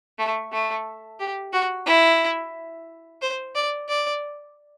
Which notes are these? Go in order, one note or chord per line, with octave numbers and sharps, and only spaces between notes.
A3
A3
G4
F#4
E4
C5
D5
D5